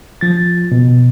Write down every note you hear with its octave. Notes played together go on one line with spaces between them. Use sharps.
F3 A6
B2